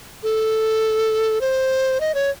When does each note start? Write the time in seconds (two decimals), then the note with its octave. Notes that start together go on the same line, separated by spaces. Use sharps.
0.23 A4
1.41 C5
2.01 D#5
2.15 C#5